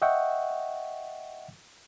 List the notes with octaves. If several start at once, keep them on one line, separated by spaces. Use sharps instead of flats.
D#5 E5 F#5 G5 C#6